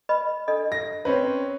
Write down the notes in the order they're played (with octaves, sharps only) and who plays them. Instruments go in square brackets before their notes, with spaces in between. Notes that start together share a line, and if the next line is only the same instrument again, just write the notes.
[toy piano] B4 D#5 B5
D4 A4 D#5
[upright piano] A#6
C4 C#4 B4